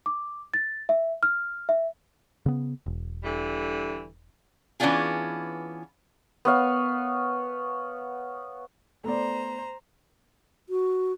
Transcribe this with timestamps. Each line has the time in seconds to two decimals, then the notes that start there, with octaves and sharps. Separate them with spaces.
0.06 D6
0.54 A6
0.89 E5
1.23 F6
1.69 E5
2.46 C#3 B3
2.86 E1
3.23 D3 E3 G3
4.80 E3 B3 C#4 D4 F4 G#4
6.45 B3 C#5 F5
9.04 A3 B3 C5 D5 A#5
10.69 F#4